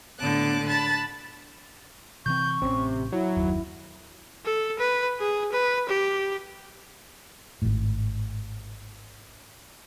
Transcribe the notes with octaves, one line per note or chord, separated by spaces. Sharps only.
A2 D3 B3 A5 D6 F#6
A5 B5 F#6 A6
C3 E3 C4 C#6 G6
A1 C3 C#4
F#3 E4
F#1 D#2
A4
B4
G#4
B4
G4
G#1 A2